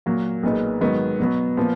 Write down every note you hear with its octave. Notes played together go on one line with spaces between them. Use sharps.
A#2 F#3 A#3
B1 A#2 G#3 B3 D#4
G#2 D#3 F#3 B3
B2 F#3 B3
A#2 F3 B3